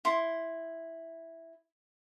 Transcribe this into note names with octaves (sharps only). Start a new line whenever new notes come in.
E4 C6